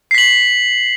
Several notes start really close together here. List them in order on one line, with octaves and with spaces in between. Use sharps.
C7 B6 F#7